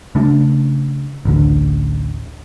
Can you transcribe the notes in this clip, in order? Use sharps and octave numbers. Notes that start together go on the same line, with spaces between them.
C#3 A3 D4
A1 D2 D3